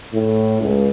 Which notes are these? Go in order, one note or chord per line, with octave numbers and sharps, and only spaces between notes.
A2
C#2